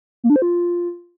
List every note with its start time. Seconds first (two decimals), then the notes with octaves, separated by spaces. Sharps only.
0.24 A#3
0.30 D4
0.36 C5
0.42 F4